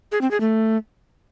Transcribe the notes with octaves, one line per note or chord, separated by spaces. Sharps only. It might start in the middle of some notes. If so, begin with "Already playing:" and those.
G#4
C4
G#4
A3